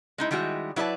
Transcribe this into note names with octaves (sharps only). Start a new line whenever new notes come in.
G#3 D#4 E4
D#3 G3 G#3 E4 F#4
F#3 E4 B4 D5 A5